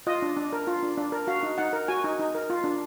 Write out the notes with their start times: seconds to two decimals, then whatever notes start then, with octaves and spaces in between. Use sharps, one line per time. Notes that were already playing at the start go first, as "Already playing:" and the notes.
0.07 F4 D#5
0.22 D4
0.37 D4
0.53 A#4
0.67 F4
0.83 D4
0.97 D4
1.12 A#4
1.27 F#4 F5
1.43 D#4
1.58 D#4 F#5
1.73 A#4
1.88 F#4 G#5
2.04 D#4
2.19 D#4
2.35 A#4
2.50 F4
2.64 D4